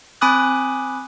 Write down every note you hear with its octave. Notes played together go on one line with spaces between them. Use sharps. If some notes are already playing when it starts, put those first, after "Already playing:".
C4 G#5 B5 D6 D#6 F#6